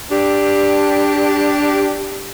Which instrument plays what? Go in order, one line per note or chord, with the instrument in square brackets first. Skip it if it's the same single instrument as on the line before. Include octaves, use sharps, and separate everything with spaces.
[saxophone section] D4 G4